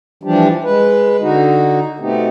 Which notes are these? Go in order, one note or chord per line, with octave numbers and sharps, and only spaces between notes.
E3 F3 G3 D4 G4
G#3 B4
D3 D#4 F#4
B2 A3 B3 C4 D#4 G4